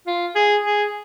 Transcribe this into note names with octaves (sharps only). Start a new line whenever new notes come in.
F4
G#4
G#4